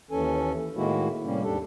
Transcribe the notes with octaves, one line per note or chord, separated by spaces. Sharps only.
D#2 E3 C#4 A4 G#5
A2 D#3 G#3 A#3 E4 F#4
A2 C3 G3 A#3 C#4
D#2 G#2 D4 G4 A4